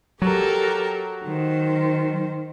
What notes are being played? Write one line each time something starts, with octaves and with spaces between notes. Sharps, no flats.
F#3 G4 A4 A#4
D#3 C5